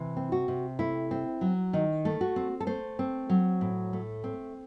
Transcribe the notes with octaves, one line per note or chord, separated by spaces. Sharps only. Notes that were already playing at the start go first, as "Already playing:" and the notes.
Already playing: C3 E3
C4
F#4
C3
A3 E4
C4
F#3
D#3 D#4
A3
F#4
C4
A4
A3 C5
C4
F#3
A2
A3
C4